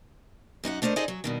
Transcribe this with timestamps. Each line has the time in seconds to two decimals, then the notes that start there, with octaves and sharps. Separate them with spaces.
0.64 F#2 D#4 A4 F#5
0.82 A3 D4 A#4 C5 D#5
0.96 D#4 G#4 A4 C5 D5 D#5
1.08 F#3
1.24 G2 B2 D#3